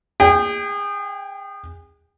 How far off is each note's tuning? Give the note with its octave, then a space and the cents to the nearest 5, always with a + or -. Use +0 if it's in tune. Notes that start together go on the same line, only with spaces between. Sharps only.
G#4 -30 G5 +0